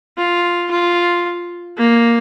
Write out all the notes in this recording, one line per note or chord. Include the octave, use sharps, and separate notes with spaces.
F4
F4
A#3